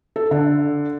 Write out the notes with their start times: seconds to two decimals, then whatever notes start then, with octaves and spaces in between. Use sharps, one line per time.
0.16 A4
0.31 D3